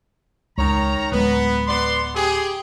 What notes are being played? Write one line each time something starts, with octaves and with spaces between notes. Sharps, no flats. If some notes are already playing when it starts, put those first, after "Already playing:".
C#2 D#3 C#5 A#5
D1 G#3 B3
B3 D5 C6
G4 G#4